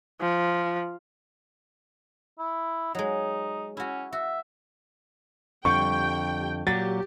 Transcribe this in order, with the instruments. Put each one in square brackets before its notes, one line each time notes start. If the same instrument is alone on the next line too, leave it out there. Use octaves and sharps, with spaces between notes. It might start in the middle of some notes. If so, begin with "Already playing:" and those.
[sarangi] F3
[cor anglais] E4
[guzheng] F#3 G#3 [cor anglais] D#4
[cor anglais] C#4 [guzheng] E4 F#4
[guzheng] F#4 [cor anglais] E5
[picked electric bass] F2 D3 [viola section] G3 G5 [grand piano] C#6
[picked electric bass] A#2 F#3 [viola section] G4 [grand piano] A6